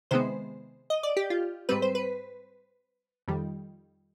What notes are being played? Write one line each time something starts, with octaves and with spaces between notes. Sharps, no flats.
C3 D#3 G#3 B3 C5
D#5
D5
G4
F4
G#2 G3 C4 B4
C5
B4
F2 D#3 G3